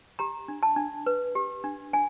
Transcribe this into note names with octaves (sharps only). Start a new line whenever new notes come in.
G4 A#5
D4
A5
D4
B4
G4
D4
D4 G#5